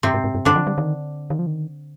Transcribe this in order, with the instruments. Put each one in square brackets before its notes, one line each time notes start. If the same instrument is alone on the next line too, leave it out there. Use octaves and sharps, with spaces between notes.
[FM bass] G2 [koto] C3 C4
[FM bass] G#2
G#2
G2
[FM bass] G2 [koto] D3 D4
[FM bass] F3
G3
D#3
D#3
F3
D#3